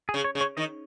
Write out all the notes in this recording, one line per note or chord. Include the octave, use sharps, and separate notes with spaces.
G#4
C#3
C#5
C#3
C#5
D#3 D#5